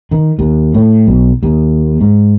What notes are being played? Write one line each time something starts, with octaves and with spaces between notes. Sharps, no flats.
D#3
D#2
A2
B1
D#2
G#2